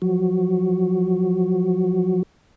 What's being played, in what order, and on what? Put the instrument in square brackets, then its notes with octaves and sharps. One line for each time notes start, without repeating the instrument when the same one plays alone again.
[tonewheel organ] F3 F#3 F#4